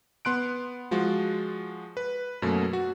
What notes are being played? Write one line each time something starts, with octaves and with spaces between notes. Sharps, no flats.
B3 C6 F#6 D7
F3 G#3 F4 F#4
B4
F#2 B2 A3 A#3
F#4